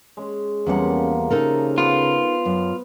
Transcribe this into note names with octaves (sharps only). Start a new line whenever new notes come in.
G#3 C#4
E2 C3 F3 G3 A#3 C#4 F#5
C#3 D#4 A4 A#4
B3 F4
F#2